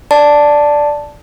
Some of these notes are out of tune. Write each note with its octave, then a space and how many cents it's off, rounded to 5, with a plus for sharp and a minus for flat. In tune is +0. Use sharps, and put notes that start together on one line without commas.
D5 +0 A5 +0